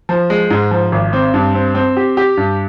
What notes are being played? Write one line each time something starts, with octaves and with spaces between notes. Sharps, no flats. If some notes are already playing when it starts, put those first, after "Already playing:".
F3
G#3
G#2
F3
G#1
C4
G2
C4
C4
G4
G4
G2